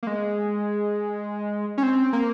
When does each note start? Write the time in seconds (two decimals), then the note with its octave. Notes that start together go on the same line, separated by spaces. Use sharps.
0.03 A#3
0.07 G#3
1.78 C#4
1.83 C4
2.13 A#3